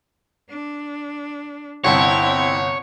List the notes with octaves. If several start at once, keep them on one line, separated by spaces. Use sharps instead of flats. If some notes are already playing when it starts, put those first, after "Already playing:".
D4
G1 C2 C4 E4 C#5